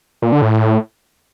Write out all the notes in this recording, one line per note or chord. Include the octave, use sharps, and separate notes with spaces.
A#2
D3
A2